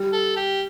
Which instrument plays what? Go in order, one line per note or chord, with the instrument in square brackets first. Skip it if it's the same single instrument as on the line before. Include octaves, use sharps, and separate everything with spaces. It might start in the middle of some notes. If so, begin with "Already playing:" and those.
Already playing: [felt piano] G3
[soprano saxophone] A4
G4